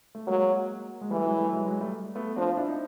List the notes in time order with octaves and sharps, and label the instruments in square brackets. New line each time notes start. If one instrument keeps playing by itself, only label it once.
[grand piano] A3
[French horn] F#3 [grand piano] G#3 A#3
[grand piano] G#3
[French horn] E3 [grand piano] G3 A3
[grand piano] F#3 G#3
G3 A3
F#3 G#3
F#3 G#3
G3 A3
A3 B3
[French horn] F3 [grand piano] C4 D4
[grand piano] F4
D4 E4
D#4